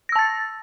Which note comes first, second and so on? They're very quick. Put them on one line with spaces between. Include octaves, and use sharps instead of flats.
A#6 E6 A5 A6